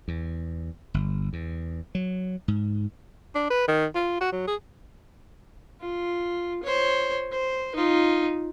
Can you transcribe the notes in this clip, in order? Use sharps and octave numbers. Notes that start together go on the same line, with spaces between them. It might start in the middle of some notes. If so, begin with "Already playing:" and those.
E2
G1
E2
F#3
G#2
D4
B4
D#3
F4
F#4
F#3
G#4
F4
C5 C#5
C5
D#4 F4